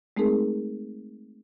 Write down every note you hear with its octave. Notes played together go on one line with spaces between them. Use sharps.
G#3 A3 C4 D#4 G#4 A#4